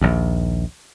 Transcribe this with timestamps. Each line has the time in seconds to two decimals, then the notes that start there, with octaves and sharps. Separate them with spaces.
0.01 A#1 D#2